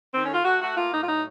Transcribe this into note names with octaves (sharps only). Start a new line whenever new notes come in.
D#3 C4
A3 C#4
F4
A3 F#4
A3 F#4
A#3 F4
A2 D#4
F4
F#3 D#4